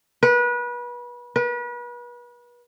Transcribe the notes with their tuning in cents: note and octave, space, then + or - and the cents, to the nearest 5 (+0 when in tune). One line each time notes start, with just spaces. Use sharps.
B4 -30
B4 -35